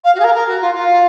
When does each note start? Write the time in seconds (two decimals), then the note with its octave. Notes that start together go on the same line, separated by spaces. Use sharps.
0.03 F5
0.14 F#4
0.19 G#4
0.23 A#4
0.34 A#4
0.47 F#4
0.61 F4
0.75 F4